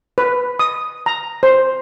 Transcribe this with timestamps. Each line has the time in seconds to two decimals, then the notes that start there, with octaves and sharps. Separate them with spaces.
0.18 B4
0.59 D#6
1.06 A#5
1.43 C5